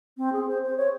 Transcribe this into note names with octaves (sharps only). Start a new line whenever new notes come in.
C4
G#4
C5
C5
C#5